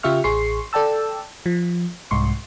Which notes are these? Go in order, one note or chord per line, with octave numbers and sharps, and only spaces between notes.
C#3 F4 G4 E5 C#6 F6
A1 G#4 C6 C#6 C7
A4 D5 G5 A5 E6
F3
C2 G#2 C6 C#6